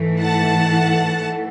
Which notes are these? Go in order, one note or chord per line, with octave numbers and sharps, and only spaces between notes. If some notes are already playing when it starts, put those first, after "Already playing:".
Already playing: G#2 E3 A3
F#5 A5